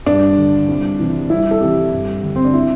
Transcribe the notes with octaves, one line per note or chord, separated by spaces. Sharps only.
G2 D4
D3
C2
C3 E3
C2 E4
A4
C3 E3 G4
G2
D3
C4
D4
E4